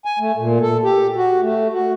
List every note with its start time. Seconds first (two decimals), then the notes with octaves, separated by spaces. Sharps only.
0.05 G#5
0.19 A3
0.37 A#2
0.61 A4
0.84 G4
1.16 F#4
1.41 A3
1.73 F#4